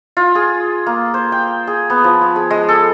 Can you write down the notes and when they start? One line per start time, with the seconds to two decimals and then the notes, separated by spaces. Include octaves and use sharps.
0.17 F4
0.35 G#4
0.86 A#3
1.14 C5
1.32 G5
1.67 G#4
1.90 B3
2.04 F3
2.21 B5
2.36 G#4
2.51 G#3
2.68 A4